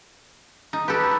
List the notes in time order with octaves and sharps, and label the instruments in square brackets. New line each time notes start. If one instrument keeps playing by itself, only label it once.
[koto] D#4
[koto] G4 A4 [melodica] B4